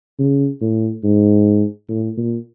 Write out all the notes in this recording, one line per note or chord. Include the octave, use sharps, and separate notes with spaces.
C#3
A2
G#2
A2
A#2